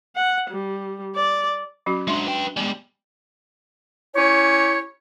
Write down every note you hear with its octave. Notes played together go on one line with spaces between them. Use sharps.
F#5
G3
D5
F#3 C#4 F#4
G#3 D4 F#4 E5 C6
B4 G5
G3 G#3 B3
C#4 E4 G4 C#5